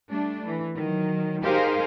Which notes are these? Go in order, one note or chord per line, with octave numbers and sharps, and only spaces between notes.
G3 A3 D4
E3
D#3 F#3
D#4 G4 G#4 A#4 C5 F5